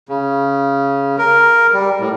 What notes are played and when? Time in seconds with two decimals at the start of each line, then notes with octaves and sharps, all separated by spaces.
0.09 C#3
1.18 A#4
1.73 G3
2.00 A2